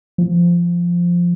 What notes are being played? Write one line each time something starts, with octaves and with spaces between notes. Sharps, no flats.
F3